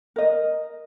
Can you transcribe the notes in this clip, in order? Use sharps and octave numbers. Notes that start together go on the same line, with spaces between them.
A#4 D#5